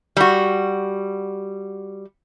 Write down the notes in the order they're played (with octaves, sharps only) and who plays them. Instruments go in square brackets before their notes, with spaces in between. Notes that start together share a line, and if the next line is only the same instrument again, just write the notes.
[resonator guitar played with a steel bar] G3 F#4